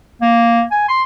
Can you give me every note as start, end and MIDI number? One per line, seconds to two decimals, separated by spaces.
0.21 0.63 58
0.71 0.84 80
0.88 1.02 84